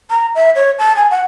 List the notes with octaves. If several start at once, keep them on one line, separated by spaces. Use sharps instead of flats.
A#5
E5
C#5
A5
G#5
F#5